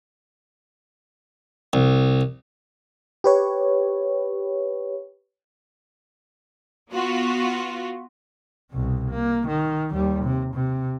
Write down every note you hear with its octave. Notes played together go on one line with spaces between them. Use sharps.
C2
G4 B4 C#5
B3 F4 F#4
C2 B2
A#3
D#3
D#2 G3
C3
C3